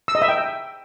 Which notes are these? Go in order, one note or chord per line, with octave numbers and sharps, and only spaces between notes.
E6
D#5
E5
G5